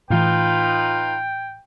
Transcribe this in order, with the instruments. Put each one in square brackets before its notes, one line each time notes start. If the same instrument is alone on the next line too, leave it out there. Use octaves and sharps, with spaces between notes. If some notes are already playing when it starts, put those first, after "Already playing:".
[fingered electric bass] A2 E3 [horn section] D#4 F4 B4 [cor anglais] G5